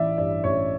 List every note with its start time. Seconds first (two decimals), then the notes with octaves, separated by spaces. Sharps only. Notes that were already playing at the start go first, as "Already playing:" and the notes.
Already playing: A1 E3 D5 E5
0.18 G2 D5
0.44 A1 C#5